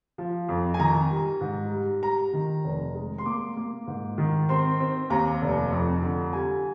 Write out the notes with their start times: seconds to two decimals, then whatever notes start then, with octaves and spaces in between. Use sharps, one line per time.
0.18 F3
0.49 F2
0.74 G#5
0.80 D#3 A#5
1.10 G3
1.41 G#2
1.71 G3
2.03 G3 A#5
2.33 D#3
2.64 F1
2.95 G#3
3.18 C6
3.26 A#3 D6
3.57 A#3
3.87 G#2
4.18 D#3
4.49 C4 C6
4.80 C4
5.10 D#2 A#5
5.42 F1
5.72 F2
6.02 D3
6.33 G3 G#5